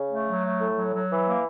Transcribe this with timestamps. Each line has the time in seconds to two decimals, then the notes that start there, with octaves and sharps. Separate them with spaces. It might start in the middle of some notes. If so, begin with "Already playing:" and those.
Already playing: C#3
0.10 A3
0.27 F#3
0.43 A3
0.60 A2
0.76 F#3
0.93 F#3
1.09 E3
1.26 A#3